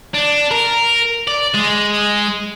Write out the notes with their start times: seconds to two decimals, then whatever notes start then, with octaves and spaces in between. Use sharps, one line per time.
0.14 D4
0.51 A#4
1.27 D5
1.54 G#3